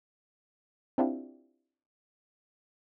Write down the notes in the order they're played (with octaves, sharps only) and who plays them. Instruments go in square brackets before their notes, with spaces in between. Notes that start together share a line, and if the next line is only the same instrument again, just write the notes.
[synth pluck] C4 D4 E4 F4 G4